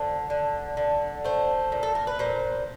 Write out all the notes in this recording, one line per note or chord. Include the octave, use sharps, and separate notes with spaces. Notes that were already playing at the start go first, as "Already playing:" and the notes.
Already playing: D3 C5
D3
D3
A3 C5
A#2
A4
A#4
B4
A#2 C5